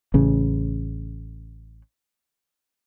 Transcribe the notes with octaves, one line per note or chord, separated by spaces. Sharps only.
A1 C#3